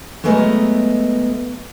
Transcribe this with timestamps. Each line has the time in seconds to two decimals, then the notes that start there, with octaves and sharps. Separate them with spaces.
0.24 F#3 G#3 A3 B3 A#4 D#5